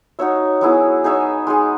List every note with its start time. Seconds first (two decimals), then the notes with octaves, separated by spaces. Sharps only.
0.19 D#4 F#4 C#5 E5
0.61 F#3 B3 E4 G#4
1.04 D#4 G#4 C#5 E5
1.47 G#3 D#4 G#4